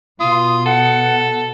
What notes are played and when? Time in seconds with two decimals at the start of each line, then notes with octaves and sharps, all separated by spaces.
0.20 B2 F4 D#6
0.66 A4 F#5